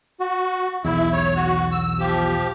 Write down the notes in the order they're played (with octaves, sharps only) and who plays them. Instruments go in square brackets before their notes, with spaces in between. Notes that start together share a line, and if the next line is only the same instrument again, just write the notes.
[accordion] F#4
[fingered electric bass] B1 E2 [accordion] E4
[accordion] C#5
F#4
E6
F3 G4